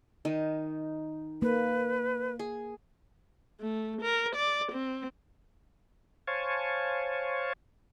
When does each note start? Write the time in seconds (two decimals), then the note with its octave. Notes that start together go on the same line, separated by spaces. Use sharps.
0.25 D#3 D#4
1.42 A#3 B4
2.39 G#4
3.60 A3
4.01 A#4
4.35 D5
4.72 C4
6.27 C5 C#5 F5 G#5 A5 C#6